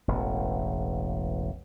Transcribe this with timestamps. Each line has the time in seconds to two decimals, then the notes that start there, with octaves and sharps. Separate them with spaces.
0.08 E1 A1